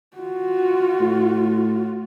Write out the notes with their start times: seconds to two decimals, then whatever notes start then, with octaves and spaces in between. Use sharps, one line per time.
0.17 F4 F#4
1.00 A2